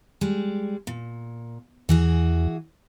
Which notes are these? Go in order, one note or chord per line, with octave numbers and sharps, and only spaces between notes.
G3 G#3
A#2
E2 E3 F#4 G#4